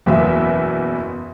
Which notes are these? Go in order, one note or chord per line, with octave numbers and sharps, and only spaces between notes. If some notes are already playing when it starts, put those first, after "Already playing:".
F#1 E2 B2 E3 F#3 E5